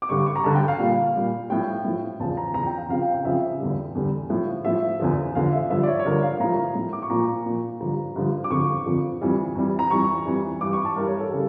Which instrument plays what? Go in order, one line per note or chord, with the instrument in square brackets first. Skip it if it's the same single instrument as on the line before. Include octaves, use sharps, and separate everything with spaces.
[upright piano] D6
G2 D3 G3 C#6
C#6
A#5
G2 D3 G3 A5
G5
F5
A#2 G3
A#2 G3
A2 F3 G5
A2 F3
E2 C#3 F3 A5
A#5
E2 C#3 F3 A#5
G5
F5
F2 C#3 F3 F5
G5
G5
F2 C#3 F3 E5
E2 D3 G3
E2 D3 G3
A2 F3
A2 F3 E5
E2 D3 F3
E2 D3 F3 F5
E5
G2 D3 F3 E5
D5
C#5
C#5
G2 D3 F3 A#4
F5
A2 F3 A#5
A2 F3
D6
C#6
A#2 F3 A#5
A#2 F3
G2 D3 F3 A#5
G2 D3 F3
D6
F2 D3 F3 C#6
F2 D3 F3
F2 E3 G3
F2 E3 G3
A#5
F2 E3 G3 C#6
F2 E3 G3
G2 E3 G3 D6
C#6
A5
G2 E3 G3 A#4
C#5
A4
C#3 G3 A4